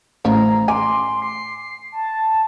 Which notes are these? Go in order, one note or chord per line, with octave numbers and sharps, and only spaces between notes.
A1 F3 A#5
G#5 C6 D6
C7
A5